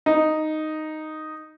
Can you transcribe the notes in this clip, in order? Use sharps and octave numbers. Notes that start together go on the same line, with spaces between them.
D#4